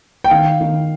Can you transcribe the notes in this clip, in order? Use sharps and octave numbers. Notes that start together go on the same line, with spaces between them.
G5
D#3 F5
D#3